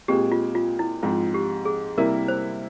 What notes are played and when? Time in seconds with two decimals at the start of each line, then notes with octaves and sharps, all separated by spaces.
0.08 A#2 G#3 C4 G4
0.32 F4
0.55 F4
0.79 E4
1.03 G#2 F3 C4 F4
1.34 G4
1.65 G#4
1.98 C3 G3 A#3 E4 A#4
2.28 C5